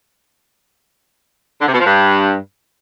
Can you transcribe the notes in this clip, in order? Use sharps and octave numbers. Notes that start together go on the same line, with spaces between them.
D3
C3
B2
F3
G2